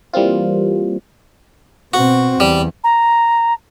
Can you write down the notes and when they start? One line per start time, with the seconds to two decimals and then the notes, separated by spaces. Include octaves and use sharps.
0.13 E3 G3 A#3 C4 F4
1.94 B2 C4 F#4
2.40 E2 G3
2.84 A#5